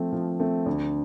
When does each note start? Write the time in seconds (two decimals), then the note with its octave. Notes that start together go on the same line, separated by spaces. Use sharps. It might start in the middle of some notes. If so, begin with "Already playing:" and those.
Already playing: F3 A3 C4
0.13 F3
0.40 A3 C4
0.66 D2